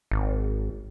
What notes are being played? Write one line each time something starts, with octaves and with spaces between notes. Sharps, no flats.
G#1